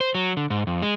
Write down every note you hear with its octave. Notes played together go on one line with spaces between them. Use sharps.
C5
F#3
D3
G#2
F2
G#3